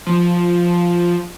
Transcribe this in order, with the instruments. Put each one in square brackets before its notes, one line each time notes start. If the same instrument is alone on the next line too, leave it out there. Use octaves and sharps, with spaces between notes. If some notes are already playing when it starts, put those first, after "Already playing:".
[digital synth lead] F3